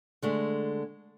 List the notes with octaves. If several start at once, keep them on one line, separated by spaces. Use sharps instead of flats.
D3 G#3 A3